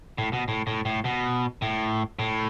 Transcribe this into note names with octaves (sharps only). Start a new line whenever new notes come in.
A2
B2
A2
A2
A2
B2
A2
A2